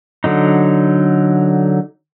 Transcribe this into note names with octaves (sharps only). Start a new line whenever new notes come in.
D3 F#3 D#4